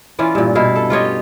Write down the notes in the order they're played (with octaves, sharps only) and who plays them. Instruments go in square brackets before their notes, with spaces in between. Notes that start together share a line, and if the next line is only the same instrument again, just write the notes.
[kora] E3 C#4 F4 D5
G2 A#2
B2 E4 F5
A4
F4 G4 C#5 D#5